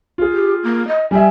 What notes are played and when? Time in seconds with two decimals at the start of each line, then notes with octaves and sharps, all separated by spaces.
0.18 F4 G#4
0.32 G4
0.63 A#3
0.87 D#5
1.11 G3 E5 G#5